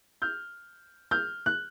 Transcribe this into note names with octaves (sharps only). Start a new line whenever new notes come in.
F6 G6
F6 G6
F#6